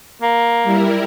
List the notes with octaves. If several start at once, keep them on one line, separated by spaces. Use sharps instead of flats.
A#3
G3 E4 A#4